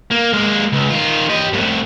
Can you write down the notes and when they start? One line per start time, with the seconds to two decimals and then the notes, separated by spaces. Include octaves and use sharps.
0.11 A#3
0.33 G#3 A#3
0.72 C#2
0.90 D#3 F4
1.29 G4 D#5
1.53 C2 A2